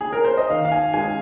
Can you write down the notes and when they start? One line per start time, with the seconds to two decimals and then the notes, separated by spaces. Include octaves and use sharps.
0.01 G#4
0.13 A#4
0.25 C5
0.37 D#5
0.50 D#3 F5
0.65 F5
0.72 G#5
0.94 G#3 G#5